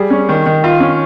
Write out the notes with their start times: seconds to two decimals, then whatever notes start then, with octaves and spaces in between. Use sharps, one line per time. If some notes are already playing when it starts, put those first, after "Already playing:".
Already playing: G3 G#4
0.10 C#4
0.29 D#3
0.46 D#3
0.64 F4
0.80 C#4